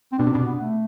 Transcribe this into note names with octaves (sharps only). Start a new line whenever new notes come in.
C4
B2 D4
C3
B2 D4
B3
A3